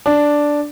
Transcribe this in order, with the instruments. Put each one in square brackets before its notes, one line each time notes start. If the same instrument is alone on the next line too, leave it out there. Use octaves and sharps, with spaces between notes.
[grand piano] D4